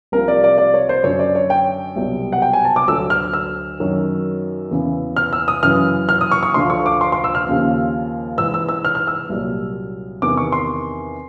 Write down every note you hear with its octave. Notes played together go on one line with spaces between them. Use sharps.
C2 C3 F3 A#4
D5
D5
D5
C#5
C5
F#2 D3 F#3 C#5
D5
C#5
G5
C2 B2 F#3
F#5
G5
G#5
A5
D6
D2 D3 F#3 E6
F6
E6
F#2 D#3 F#3
E2 C#3 E3
F6
E6
D#6
F#2 C#3 E3 F6
F6
D#6
C#6
C#6
D2 D3 F3 C6
C#6
D6
C6
C6
E6
F6
D#2 C#3 F3
G#2 E3 E6
E6
E6
F6
F6
E6
C2 A#2 F#3
E2 C3 D#3 D6
C#6
C6